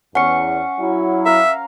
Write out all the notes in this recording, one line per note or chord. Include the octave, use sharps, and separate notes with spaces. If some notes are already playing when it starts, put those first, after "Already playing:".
E2 C#4 F#5 C#6 C#7
F#3 E4
A#4 E5 F5